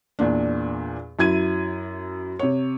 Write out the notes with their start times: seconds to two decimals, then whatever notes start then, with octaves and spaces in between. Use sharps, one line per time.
0.19 E2 A#2 D4
1.19 F#2 E4 G#6 D#7
2.39 C3 C#5